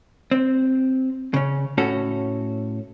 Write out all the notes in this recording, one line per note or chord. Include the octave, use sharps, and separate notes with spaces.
C4
C#3 C#4
A2 C#4 F#4 A4